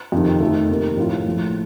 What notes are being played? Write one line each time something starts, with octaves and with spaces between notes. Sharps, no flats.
F2 C3 D#3
F2 D#3 A3
C3 D#3 A#3
A#1 A2 A3 C4 F4
A#1 A2 F3 A3